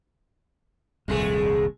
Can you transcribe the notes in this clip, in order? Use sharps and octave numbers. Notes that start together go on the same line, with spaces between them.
D#1 C2 F2 G#3 A3 G#4